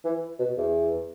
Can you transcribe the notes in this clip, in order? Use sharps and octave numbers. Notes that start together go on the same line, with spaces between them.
E3
B2
E2